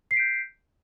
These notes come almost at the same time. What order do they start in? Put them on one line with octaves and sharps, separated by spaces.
C7 B6 D7 G6